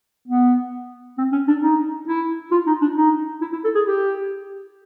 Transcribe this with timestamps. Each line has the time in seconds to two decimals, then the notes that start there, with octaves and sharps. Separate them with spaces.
0.28 B3
1.18 C4
1.32 C#4
1.48 D4
1.62 D#4
2.08 E4
2.52 F4
2.67 D#4
2.82 D4
2.96 D#4
3.41 E4
3.53 E4
3.64 A4
3.75 G#4
3.87 G4